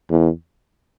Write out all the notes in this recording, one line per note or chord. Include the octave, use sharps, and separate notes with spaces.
E2